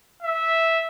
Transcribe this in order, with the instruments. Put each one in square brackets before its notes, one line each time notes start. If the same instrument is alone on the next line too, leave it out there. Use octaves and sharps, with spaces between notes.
[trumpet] E5